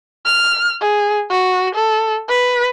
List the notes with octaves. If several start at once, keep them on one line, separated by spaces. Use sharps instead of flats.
F6
G#4
F#4
A4
B4